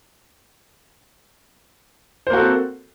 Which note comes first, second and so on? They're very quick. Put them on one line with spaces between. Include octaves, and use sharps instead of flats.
C5 A#3 F#4 A4 C4